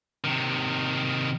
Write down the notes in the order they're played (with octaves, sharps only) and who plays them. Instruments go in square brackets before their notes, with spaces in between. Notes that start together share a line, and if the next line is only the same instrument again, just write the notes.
[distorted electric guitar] C3 D#3